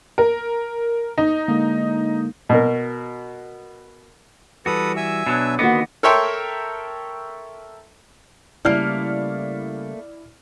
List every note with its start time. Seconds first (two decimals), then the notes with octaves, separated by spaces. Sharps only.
0.18 A#4
1.18 D#4
1.48 D3 G#3 A#3
2.49 B2 A#4
4.66 E3 G3 F#4 A4 B4 D#6
4.96 E5 G#5 E6
5.26 B2 F#3 D4
5.59 D3 D#3 A#3 B3 F#4 D#5 D6
6.03 A4 A#4 C#5 E5 G5 C6
8.65 C#3 G3 A3 A#3 E4 D5 F6